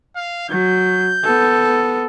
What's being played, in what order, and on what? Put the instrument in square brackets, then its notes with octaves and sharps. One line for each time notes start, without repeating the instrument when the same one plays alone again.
[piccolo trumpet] F5
[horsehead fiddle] F#3 [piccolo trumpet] G6
[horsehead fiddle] B3 A4